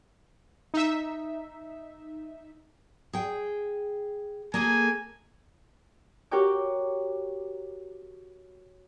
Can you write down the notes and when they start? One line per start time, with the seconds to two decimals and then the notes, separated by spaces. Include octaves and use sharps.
0.74 D#4 E5
3.13 G#4 G5
4.54 A#3 G#4 A4 G#5
6.31 F#4 G4 A#4 C#5 G5 D6